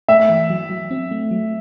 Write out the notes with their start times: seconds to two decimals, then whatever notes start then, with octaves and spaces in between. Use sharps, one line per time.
0.08 A3 E5
0.29 E3
0.50 F#3
0.70 F#3
0.91 C4
1.11 A3
1.31 F#3